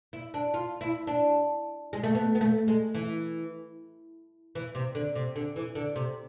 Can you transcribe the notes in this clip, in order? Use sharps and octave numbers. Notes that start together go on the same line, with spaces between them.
E4
D4
F4
E4
D4
G#3
A3
B3
B3
A3
G#3
E3
E3
C3
D3
C3
D3
E3
D3
C3